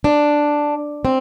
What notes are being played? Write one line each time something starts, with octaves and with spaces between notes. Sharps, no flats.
D4
C4